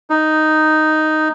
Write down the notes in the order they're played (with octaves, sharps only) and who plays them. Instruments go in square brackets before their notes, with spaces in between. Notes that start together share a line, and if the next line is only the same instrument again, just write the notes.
[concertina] D#4